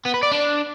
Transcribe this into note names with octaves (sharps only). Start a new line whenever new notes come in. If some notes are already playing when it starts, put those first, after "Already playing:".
B3
B4
D5
D4